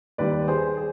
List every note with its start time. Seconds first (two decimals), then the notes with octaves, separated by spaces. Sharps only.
0.18 D#2 D#3 G3 B4 D5
0.48 G#4 C5
0.77 G#4